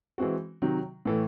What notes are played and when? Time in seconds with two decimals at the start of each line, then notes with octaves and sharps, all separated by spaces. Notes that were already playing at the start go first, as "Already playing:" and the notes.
0.18 E3 G#3 C4 F#4
0.62 C3 D#3 F#3
1.05 A2 E3 A3